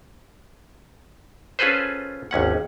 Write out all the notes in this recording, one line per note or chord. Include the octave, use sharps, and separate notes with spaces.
C#4 F4 G#4 A4 B4 C5
G#1 D#2 C#4 F#5